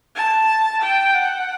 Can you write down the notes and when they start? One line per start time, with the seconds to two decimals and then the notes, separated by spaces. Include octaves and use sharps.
0.15 A5
0.82 G5
1.15 F#5